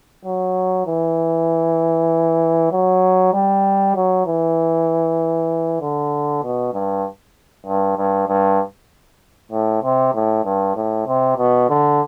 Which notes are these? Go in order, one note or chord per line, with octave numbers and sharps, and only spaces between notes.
F#3
E3
F#3
G3
F#3
E3
D3
B2
G2
G2
G2
G2
A2
C3
A2
G2
A2
C3
B2
D3